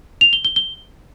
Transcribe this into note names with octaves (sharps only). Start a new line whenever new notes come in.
F7
G7
G7
G7